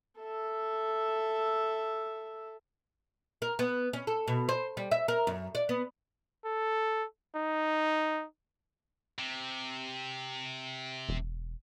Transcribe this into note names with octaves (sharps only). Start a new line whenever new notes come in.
A4 E5
A#4
B3
C#4
A4
B2
C5
G3
E5
A#4
F#2
D5
B3
A4
D#4
C3
E1